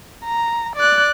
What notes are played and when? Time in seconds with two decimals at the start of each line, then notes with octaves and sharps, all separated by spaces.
0.25 A#5
0.76 D5 F#6